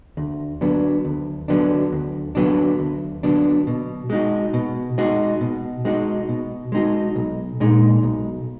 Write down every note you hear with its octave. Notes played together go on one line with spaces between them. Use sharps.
D2
D3 F#3 B3 D4
D2
D3 F#3 B3 D4
D2
D3 F#3 B3 D4
D2
D3 F#3 B3 D4
B2
G#3 D#4 F#4
B2
G#3 D#4 F#4
B2
G#3 D#4 F#4
B2
G#3 D#4 F#4
B1
A#2 G#3 D#4
B1